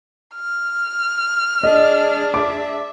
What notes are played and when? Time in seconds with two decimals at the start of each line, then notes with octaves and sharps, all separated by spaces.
0.35 F6
1.63 D4 G#4 D#5
2.34 E5 D6